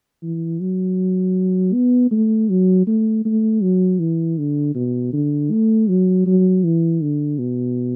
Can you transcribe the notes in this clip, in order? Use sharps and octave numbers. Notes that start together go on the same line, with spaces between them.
E3
F#3
B3
A3
F#3
A3
A3
F#3
E3
D3
B2
D3
A3
F#3
F#3
E3
D3
B2